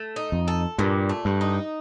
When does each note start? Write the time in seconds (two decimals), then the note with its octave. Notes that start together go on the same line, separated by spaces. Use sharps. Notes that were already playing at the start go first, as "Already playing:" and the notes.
Already playing: A3
0.16 D#4
0.32 F2
0.48 A4
0.78 G2 A#2
1.09 A3
1.25 G2
1.41 D#4